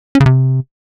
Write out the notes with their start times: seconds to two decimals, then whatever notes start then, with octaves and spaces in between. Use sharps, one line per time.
0.15 C#4
0.20 C#3
0.26 C3